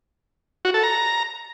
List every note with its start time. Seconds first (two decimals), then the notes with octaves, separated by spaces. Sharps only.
0.65 F#4
0.74 A4
0.83 A#5